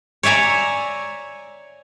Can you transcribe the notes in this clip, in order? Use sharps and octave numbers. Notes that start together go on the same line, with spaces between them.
C#5 D5 E5 G#5 A#5